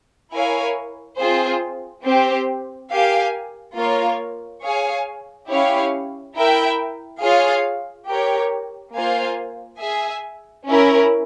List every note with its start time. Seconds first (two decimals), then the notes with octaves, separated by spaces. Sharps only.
0.32 E4 A#4 C#5 F5 G#5
1.17 C4 F4 G#4 C5
2.04 C4 G4 C5
2.90 G4 A#4 F5 G#5
3.77 A#3 F4 A#4 C#5 F5
4.63 G#4 C#5 F5 G#5
5.49 C#4 E4 G4 C#5 F5
6.36 E4 A#4 E5 G5
7.22 F4 G#4 C#5 F5
8.08 G4 A#4 C#5
8.94 A#3 F4 C5 F5 G#5
9.80 G#4 E5 G#5
10.67 C#4 E4 A#4